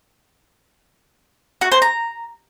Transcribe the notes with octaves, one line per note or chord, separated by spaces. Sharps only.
F#4
C5
A#5